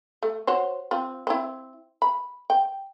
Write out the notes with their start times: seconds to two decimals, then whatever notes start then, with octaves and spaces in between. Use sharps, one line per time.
0.23 A3
0.47 F#4 C5 C#5
0.91 C4 F4
1.27 C4 E4
2.02 B5
2.50 G5